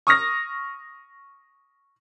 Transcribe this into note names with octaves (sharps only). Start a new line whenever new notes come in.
C#6 D#6 F6 A#6